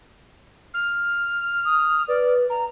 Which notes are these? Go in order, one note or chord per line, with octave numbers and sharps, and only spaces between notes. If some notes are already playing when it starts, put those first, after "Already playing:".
F6
D#6
B4 D5
A#5